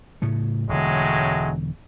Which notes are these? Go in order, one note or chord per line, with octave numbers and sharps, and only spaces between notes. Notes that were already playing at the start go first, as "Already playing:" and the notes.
A2 C#3 A3
E1 A2 D3 F#3 G#3